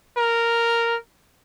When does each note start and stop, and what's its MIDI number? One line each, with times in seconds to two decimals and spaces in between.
0.17 0.96 70